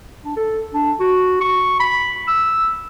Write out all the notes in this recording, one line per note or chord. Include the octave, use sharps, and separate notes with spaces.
D4
A4
D4
F#4
C#6
B5
E6